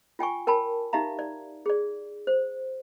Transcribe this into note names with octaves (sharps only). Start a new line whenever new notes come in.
F4 G5 G#5 C#6
A#4 G5 A5 B5
D#4 G4 E5 F5 A#5
D5
G#4 D5
C5